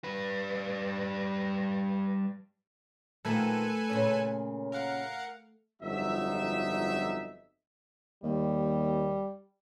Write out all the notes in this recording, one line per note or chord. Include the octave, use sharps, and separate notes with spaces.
G3 B4
A#2 D#3 F3 A3 A4 B4 G#5
A#2 C#3 C#4
A#4 F5 F#5
G1 F2 F#3 D#4 E5
D#2 G3